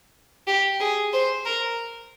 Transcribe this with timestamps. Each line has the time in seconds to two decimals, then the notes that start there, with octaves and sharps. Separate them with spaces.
0.47 G4
0.80 G#4
1.13 C5
1.46 A#4